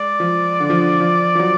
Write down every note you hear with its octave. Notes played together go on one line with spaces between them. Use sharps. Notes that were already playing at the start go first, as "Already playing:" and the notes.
Already playing: G#3 D5
F3
D3
F3
D3
F3
F3
F#3